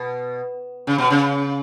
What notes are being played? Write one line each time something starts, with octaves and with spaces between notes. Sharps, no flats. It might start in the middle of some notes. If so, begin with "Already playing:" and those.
Already playing: B2
C#3
B2
C#3